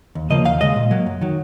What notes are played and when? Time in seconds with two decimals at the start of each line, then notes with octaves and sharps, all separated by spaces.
0.15 D#2
0.30 C#3 F3 A#3 D#5
0.45 D#2 F5
0.60 C#3 G#3 D#5
0.76 A#2
0.91 F#3 A#3
1.06 F#2
1.21 D#3 F#3